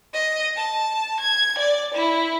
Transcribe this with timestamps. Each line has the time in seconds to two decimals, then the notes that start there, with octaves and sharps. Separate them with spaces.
0.13 D#5
0.56 A5
1.20 G#6
1.58 D5
1.95 E4